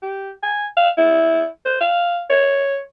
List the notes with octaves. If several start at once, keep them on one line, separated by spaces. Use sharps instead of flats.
G4
G#5
F5
E4
C5
F5
C#5